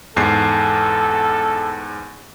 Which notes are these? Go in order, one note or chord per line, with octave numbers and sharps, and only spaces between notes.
E2 G#2 A4 C7